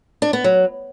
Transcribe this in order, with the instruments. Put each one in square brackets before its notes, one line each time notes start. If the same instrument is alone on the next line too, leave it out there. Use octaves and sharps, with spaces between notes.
[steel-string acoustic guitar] D4
B3
F#3